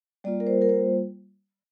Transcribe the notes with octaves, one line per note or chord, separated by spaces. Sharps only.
G3 A#3 F4 D5
A#4
C5
A#4
C5